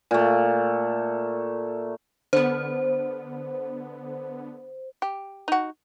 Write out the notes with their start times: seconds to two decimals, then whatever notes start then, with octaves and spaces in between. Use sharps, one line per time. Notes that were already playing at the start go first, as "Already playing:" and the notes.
0.11 A#2 A3
2.33 D3 B3 C5
5.02 G4
5.48 D#4 F#4